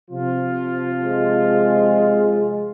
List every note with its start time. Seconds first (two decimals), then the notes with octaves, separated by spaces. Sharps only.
0.11 C3 F3 F4
1.05 G#3